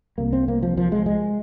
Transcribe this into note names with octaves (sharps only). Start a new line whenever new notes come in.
C2 C3 A#3
C4
A#3
F3
F3
G#3
G#3